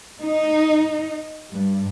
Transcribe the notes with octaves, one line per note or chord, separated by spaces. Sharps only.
D#4
G2